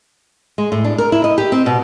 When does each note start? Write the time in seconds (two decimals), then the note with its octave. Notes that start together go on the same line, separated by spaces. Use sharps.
0.58 G#3
0.72 A2
0.85 D4
0.98 A#4
1.12 E4
1.24 D#5
1.38 G4
1.52 C4
1.66 B2